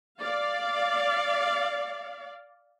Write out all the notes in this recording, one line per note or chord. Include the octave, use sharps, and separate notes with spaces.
D5 F5